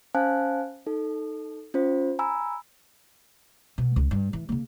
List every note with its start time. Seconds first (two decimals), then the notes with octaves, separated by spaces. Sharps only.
0.15 C#4 C5 F5 G#5 A5 F#6
0.86 D#4 A4
1.74 C#4 F4 C5
2.19 G#5 A#5 B5 E6
3.78 B2
3.96 C#2
4.11 G2
4.33 E3
4.49 C#3 A#3